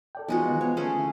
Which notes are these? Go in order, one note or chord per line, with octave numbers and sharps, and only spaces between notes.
A4 D5 G5
E3 F3 G#3 B3 D#4 F#4
D#3 B3
B3 C#5
A3 C#4 G#4
D3 E4